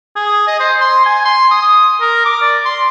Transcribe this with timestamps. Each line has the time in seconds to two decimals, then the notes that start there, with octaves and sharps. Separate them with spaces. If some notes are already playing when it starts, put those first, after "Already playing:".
0.16 G#4
0.47 D#5
0.60 C5
0.81 C6
1.06 G#5
1.25 C6
1.51 D#6
2.01 A#4
2.25 D6
2.42 D5
2.65 C6